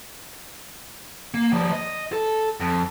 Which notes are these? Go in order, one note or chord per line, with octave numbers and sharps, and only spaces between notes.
A#3
F3 G3
D#5
A4
F2